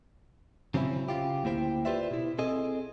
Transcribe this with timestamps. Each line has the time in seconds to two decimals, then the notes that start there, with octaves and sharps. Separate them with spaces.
0.74 C#3 F#3 C4 C#4 E4
1.09 C#3 F4 G4
1.44 D2 A#3 E4 C5 G5
1.85 F4 G4 B4 C5 D5 E5
2.11 B2 E4
2.38 C4 G#4 A4 D#5